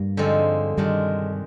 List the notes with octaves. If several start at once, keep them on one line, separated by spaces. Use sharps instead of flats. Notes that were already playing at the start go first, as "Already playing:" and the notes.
Already playing: G2 G3 A#3
D3 F3 G#3 C4 D#4
G2 C3 D#3 G3 G#3 D4